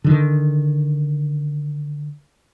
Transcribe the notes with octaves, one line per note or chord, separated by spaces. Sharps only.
D3 D#3